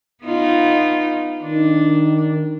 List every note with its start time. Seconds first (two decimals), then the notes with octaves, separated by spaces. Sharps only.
0.25 B3 D#4 F4
1.43 D#3 D4